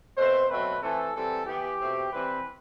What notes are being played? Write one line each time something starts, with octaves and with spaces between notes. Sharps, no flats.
B2 A3 C4 C5
B2 F#3 A3 C4 B4
E3 A3 C4 A4
E3 G3 C4 A4
E3 B3 G4
B2 A3 C4
E3 G3 C4 B4